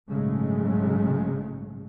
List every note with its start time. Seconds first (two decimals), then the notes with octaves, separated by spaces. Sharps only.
0.10 A#1 G#2 C#3 F#3 G#3 A3